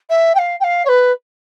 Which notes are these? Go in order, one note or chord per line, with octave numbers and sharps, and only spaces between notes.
E5
G5
F5
G5
F5
C#5
B4